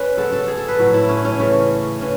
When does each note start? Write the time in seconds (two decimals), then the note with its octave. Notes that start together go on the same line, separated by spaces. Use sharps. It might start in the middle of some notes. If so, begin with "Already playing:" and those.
Already playing: C#4 B4
0.17 C#3 G#3 B3 A4
0.33 A4
0.48 G#4
0.57 A4
0.68 B4
0.78 A2 F#3 A3
0.94 E4
1.09 C#4
1.25 C#4
1.40 C#3 E3 A3
2.01 E3 C#4